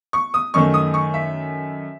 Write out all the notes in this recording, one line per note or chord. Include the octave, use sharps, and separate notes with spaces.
C#6
D#6
F#2 D#3 A3 C#6
D#6
C#6
E5